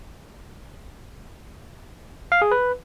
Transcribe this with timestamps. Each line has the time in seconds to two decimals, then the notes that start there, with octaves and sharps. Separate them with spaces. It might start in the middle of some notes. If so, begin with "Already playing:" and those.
2.32 F5
2.42 G#4
2.51 B4